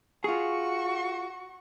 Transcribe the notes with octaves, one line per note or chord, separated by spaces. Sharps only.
F4 F#4 G#4 C#6